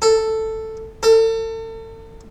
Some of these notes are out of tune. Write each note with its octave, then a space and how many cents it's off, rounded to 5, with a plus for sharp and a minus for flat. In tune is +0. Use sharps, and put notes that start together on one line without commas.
A4 +5
A4 +35